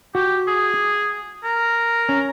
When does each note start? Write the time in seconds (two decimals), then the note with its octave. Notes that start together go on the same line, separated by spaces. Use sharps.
0.15 F#4 G4
0.47 G#4
1.44 A#4
2.09 C#4